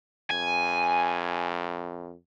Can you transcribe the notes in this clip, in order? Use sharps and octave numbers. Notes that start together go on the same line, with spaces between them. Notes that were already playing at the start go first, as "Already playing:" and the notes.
F2 G#5